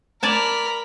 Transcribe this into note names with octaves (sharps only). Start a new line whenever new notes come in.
A#4 D5 G#5 A5 B5